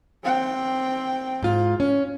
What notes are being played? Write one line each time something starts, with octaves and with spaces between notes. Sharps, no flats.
C4 G5
G#2 F4
C#4